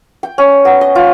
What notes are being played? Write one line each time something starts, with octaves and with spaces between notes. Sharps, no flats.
G5
C#4
B3
D#5
F4